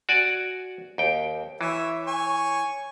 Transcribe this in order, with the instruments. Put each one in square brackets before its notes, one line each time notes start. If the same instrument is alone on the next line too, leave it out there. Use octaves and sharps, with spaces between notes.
[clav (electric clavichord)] F#4 D5 G#5
D#2 G5
[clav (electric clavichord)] E3 [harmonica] C#5 E5
[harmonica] C#5 G#5 C#6